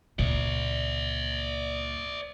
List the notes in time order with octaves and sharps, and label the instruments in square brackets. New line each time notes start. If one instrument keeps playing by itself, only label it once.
[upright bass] C#2 A#2 [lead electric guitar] C5 D5